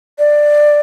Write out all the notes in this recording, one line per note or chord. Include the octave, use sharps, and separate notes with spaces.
D5